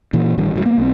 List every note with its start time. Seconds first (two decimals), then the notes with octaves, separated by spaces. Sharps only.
0.13 A#2 E3
0.38 A1 D#3 G3
0.54 F#1 G#2 F#3
0.66 A#3 B3
0.78 B1 C4